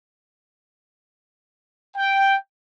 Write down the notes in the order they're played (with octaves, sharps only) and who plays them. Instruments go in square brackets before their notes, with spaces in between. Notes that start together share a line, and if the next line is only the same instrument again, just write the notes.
[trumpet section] G5